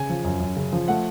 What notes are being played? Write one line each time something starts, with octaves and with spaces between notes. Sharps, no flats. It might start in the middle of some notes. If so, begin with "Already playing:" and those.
Already playing: C#3 G#5
F3
F#2
F#2
C#3
F3
A3 F#5